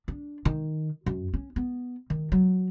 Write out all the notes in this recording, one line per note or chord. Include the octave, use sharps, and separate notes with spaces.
D4
D#3
F#2
C#4
B3
D#3
F#3